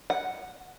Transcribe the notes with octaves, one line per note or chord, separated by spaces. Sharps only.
F#5